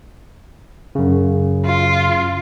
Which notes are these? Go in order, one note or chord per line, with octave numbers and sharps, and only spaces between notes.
F#2 C#3
F4